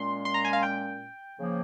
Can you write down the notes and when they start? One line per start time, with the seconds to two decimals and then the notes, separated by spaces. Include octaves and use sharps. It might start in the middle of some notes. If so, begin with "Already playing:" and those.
Already playing: A#2 G#3 C#4 C6
0.25 C6
0.34 A#5
0.45 G#5
0.53 F5
0.63 G5
1.38 C#3 F3 A#3